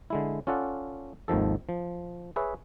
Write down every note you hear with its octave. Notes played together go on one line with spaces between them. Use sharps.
D3 G#3 E4
C#4 F4 A4 D5 F#5
G#1 D#2 D#3 F3 A4
F3
G#4 B4 C#5 E5